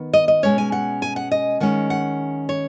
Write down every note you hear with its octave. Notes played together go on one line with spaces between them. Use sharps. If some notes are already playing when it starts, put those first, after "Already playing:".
Already playing: D#3 B3
D#5
D#5
B2 G#3 C#4 C#5
G#5
F#5
G#5
F#5
D#5
D#3 G#3 C#4 F#5
F#5
C#5